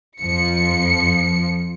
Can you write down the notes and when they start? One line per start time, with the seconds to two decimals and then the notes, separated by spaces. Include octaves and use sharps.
0.21 F2 F3 C#7